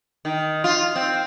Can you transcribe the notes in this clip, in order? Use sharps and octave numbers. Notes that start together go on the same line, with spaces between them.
D#3
F4
C4